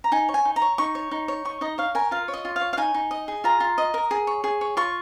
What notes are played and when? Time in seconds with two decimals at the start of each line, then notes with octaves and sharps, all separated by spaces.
0.04 A#5
0.12 D#4 G#5
0.29 C#5
0.34 G#5
0.45 D#4
0.56 A#5
0.62 C#5
0.78 D#4 C#6
0.95 C#5
1.11 D#4
1.28 C#5
1.45 D#4 C#6
1.61 D#4 D#5
1.78 C#5 F5
1.95 A#4 G#5
2.11 F4 F5
2.28 C#5
2.34 D#5
2.45 F4
2.56 F5
2.61 C#5
2.73 F5
2.78 D#4 G#5
2.94 D#4
3.11 D#5
3.28 G#4
3.44 F4 A#5
3.60 F4
3.78 D#5
3.94 A#4
4.11 G#4
4.27 C#5
4.44 G#4
4.61 C#5
4.77 F4 C#6